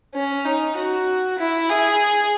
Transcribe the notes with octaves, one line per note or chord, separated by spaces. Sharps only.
C#4
D#4
F#4
E4
G#4